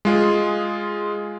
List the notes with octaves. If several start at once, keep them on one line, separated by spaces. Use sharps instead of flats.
G#3 F4 G#4